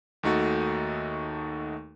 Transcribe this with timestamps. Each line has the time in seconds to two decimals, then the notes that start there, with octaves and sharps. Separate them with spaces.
0.23 D#2 A3 D#4 F#4 A4